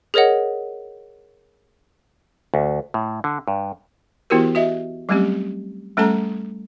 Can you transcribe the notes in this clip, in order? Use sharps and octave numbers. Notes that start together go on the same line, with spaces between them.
G#4 A#4 C#5 D#5 F#5
D2
A2
D3
G2
E3 B3 E4 F#4 G4 A#4
F#4 D#5 E5
F#3 G3 A3 C4 C#4 G4
G3 A3 C#4 A4 A5 A#5